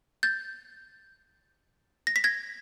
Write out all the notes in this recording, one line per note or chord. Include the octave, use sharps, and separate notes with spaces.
G6 A6
A#6
B6
G#6 A#6